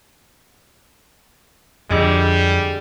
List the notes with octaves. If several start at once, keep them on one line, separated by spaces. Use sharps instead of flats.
F2 D3 G3 G#3